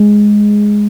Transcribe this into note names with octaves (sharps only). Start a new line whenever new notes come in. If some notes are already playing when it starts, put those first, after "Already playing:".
Already playing: G#3